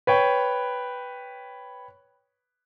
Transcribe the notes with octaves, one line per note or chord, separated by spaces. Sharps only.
B4 C#5 G5